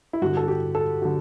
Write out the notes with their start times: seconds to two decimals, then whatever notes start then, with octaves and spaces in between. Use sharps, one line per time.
0.13 E4
0.21 G2 F#4
0.25 D3
0.37 A4
0.48 G4
0.75 A4
1.02 D3 F#4